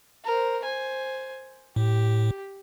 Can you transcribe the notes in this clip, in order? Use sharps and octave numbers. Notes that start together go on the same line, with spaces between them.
A#4 C5
C5 G#5
A2 G4